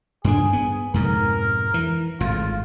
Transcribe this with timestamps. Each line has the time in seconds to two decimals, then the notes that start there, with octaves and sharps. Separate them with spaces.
0.24 G2 D4 G#4
0.53 B3
0.94 F2 G#2 B2 A#4
1.74 E3
2.20 G#1 A2 F4